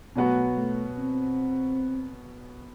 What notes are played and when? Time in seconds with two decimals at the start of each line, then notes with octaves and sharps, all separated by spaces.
0.16 B2 F#3 A3 B3 F#4
0.57 A3
0.98 C4